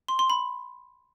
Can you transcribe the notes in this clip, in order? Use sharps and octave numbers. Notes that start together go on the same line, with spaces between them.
C6
C6
B5